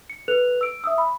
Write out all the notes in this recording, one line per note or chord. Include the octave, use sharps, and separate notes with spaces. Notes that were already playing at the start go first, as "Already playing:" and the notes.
C#7
A4 B4 F#6 F7
E6 D7
E5 D#6 E6
B5